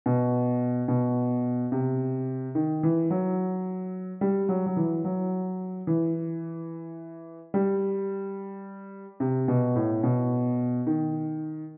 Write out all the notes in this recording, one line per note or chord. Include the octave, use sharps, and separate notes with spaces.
B2
B2
C3
D#3
E3
F#3
G3
F#3
F#3
E3
F#3
E3
G3
C3
B2
A2
B2
D#3